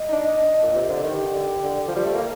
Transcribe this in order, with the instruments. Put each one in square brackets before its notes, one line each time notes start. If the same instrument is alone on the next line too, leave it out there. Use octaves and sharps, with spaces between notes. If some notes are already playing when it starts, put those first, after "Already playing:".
Already playing: [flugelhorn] D#5
[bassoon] D#4
D4
A#2
C3
D3
[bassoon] D#3 [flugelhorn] G4
[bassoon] D3
D3
F3
G3
A3
A#3